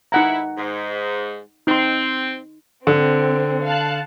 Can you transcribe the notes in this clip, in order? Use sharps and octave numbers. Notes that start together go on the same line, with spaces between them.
D#4 E4 F#5 A#5
G#2
C4 D#4 C6
D3 C4
F5 A5 F#6